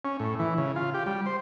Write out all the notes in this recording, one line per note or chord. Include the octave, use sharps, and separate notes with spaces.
C#4
A2
E3
C#3
F4
G4
G3
C5